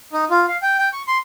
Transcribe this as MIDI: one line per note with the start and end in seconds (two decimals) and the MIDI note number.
0.13 0.25 63
0.31 0.46 65
0.48 0.57 77
0.62 0.78 79
0.78 0.89 79
0.93 1.02 85
1.08 1.18 84